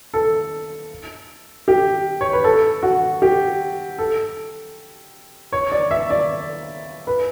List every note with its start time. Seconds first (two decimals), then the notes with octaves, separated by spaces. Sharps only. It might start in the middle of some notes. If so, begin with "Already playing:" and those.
0.14 A4
1.68 G4
2.21 C#5
2.33 B4
2.44 A4
2.83 F#4
3.22 G4
3.99 A4
5.52 C#5
5.72 D5
5.91 E5
6.10 D5
7.07 B4